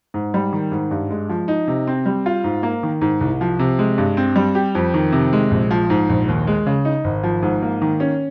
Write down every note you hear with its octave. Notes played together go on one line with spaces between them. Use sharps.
G#2
G3
D#3
G#2
G2
G#3
F3
D#4
C3
C4
G3
F4
G#2
A#3
D#3
G#2
C2
F3
C3
G#3
G2
C4
G3
G4
F2
D#3
C3
G#3
A#1
F3
G#2
A#1
D#2
G#3
C#3
D#4
G#1
F3
G#2
A#3
D#3
C#4